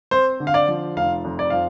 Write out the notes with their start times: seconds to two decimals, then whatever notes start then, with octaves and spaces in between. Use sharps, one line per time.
0.11 C4 C5
0.40 D3
0.47 F5
0.54 D5
0.68 F3
0.96 F1 F5
1.25 F2
1.39 D5
1.50 F3 F5